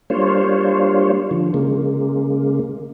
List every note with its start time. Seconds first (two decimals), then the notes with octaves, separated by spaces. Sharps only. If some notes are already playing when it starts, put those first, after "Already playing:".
0.10 G3 A#3 D4 F4 C5 C#5
1.31 D3 F3
1.54 C#3 G#3 A#3